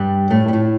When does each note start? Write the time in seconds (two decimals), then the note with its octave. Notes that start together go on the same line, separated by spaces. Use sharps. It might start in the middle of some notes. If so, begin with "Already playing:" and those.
Already playing: G2 G3
0.30 A2 A3
0.48 G3
0.53 A2 A3